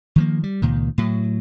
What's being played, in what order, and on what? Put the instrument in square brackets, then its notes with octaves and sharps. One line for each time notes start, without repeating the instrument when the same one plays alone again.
[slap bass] D#3 F3 A#3
G3
C#2 A#2 D#3
A2 F#3